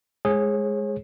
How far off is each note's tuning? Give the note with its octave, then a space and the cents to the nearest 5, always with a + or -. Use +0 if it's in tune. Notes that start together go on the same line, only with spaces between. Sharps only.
G#3 +0 G#4 +0 C#5 -35